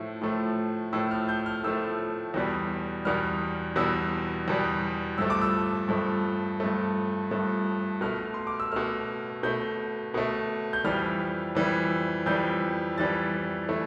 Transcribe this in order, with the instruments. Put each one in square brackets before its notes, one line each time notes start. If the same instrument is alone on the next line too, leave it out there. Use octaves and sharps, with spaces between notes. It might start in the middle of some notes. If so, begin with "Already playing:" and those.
Already playing: [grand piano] A2 F3 A3
A2 F3 A3
A2 F3 A3 E6
F6
G6
F6
A2 F3 A3 E6
E2 B2 G3
E2 B2 G3 F6
E2 B2 G3 E6
E2 B2 G3
G2 F3 A3 E6
D6
E6
G2 F3 A3
G2 F3 A3
G2 F3 A3
B2 A3 F6
C6
D6
E6
B2 A3 F6
B2 A3 G6
B2 A3
G6
F2 E3 G3 F6
F2 E3 G3
F2 E3 G3 G6
F2 E3 G3 A6
E3 A3